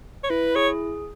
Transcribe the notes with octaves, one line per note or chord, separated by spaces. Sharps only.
C#5
E4 B4
G#4 C#5